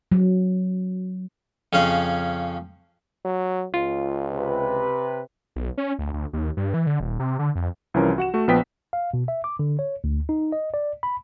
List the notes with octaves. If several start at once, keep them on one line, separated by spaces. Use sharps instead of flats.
F#3
F2 C#3 C#4 F5
F#3
C#2 F4
C3 B4
B1
C#4
D2
D2
D#2
G2
E3
D3
D#1
C3
D3
F2
C2 E3 F3 C#4 A#4
F#4 F#5 E7
A3 F#4
A#1 F3 B3 G5 B6
F5
B2
E5
D6
D3
C#5
D2
D#4
D#5
D5
B5